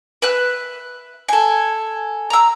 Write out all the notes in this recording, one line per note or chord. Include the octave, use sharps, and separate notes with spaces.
B4 E5 F#6
A4 G#5
A#5 E6